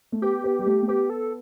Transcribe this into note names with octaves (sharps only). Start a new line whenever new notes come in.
A3
B3 G4
B3
G3
A3
A3
B3 G4
A4